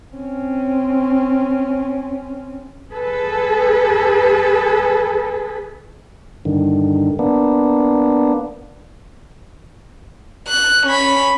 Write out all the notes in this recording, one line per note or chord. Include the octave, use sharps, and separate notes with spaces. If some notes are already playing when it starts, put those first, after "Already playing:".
C4 C#4
G#4 A4 B4
G2 D3 D#3
A#3 B3 D4
F#6
C#4 B5